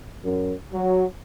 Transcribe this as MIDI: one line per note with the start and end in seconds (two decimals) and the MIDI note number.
0.23 0.53 42
0.73 1.04 54